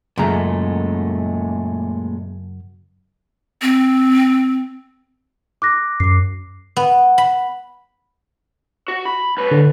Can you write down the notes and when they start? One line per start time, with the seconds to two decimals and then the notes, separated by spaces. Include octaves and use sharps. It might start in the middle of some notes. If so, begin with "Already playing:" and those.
0.18 F#2 A#2 C#3 G#3 A3 A#5
3.62 C4
5.62 D6 F#6 A#6
6.00 F#2 D6 C7
6.77 B3
7.18 B5
8.88 F#4
9.05 B5
9.37 C2 B4
9.51 D3